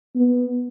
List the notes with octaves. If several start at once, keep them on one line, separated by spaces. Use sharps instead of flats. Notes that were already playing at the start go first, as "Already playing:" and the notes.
B3